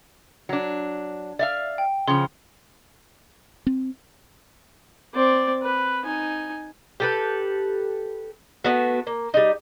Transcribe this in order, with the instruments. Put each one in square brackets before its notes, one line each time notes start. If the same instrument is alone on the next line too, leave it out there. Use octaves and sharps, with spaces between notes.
[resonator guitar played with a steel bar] F#3 D4
D5 E5 F5
[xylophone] G5
[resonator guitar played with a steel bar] C#3 F3 [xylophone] C6
[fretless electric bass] C4
[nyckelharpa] C4 D5
B4
D#4 G#5
[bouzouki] G4 A4 B4
A3 B3 F#4
A#3
G3 D#4